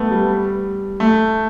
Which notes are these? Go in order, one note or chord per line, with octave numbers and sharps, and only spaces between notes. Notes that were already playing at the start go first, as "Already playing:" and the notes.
Already playing: A3 B3
G3
A3